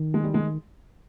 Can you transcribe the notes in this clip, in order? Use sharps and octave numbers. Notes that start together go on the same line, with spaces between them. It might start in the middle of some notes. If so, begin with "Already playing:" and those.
Already playing: D#3
G#3
G3
G#3